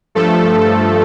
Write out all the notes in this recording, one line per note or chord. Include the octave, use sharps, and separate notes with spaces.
G2 F3 A3 A4